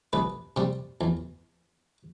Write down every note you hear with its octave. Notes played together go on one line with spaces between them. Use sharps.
C2 B4
C3 G3
E2